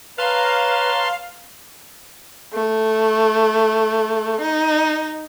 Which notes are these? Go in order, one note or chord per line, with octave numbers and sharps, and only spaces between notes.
B4 C#5 F5 A5 A#5 C6
A3
D#4